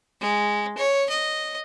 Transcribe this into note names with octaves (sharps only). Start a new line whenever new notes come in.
G#3
C#5
D#5